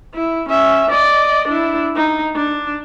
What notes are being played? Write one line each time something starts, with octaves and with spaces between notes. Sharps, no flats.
E4
C#4 E5
D5 D#5
D4 E4
D#4
D4